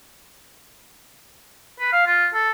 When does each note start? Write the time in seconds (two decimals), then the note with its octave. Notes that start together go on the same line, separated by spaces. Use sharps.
1.80 B4
1.92 F5
2.06 F4
2.34 A4